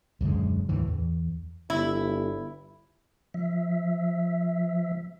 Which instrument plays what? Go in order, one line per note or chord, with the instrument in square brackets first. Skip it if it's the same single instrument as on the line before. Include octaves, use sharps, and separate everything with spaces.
[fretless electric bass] D#1 F#2 D3 G#3
D#2 A2 D3 E3
E2
[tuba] G1 [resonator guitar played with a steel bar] E4
[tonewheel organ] F3 E5